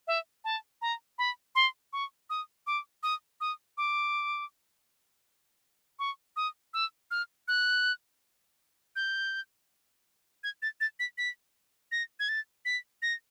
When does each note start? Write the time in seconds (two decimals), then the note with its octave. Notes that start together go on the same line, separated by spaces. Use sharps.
0.07 E5
0.44 A5
0.82 A#5
1.18 B5
1.55 C6
1.93 C#6
2.30 D#6
2.67 D6
3.03 D#6
3.40 D#6
3.77 D6
5.99 C#6
6.36 D#6
6.74 E6
7.11 F6
7.48 F#6
8.96 G6
10.44 G#6
10.62 A6
10.80 A6
10.99 B6
11.18 B6
11.92 A#6
12.20 G#6
12.29 A6
12.65 B6
13.02 A#6